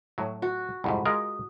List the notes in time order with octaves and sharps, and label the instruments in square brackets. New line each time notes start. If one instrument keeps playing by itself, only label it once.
[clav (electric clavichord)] A2 F#3
[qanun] F#4
[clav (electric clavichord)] C2 F2 G#2 [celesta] F#5 B5
[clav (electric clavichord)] G#3 F4 A#4 [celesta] D#6